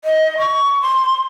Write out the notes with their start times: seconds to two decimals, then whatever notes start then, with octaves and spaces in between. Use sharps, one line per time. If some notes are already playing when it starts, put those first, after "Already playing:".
0.04 D#5
0.38 C#6
0.81 C6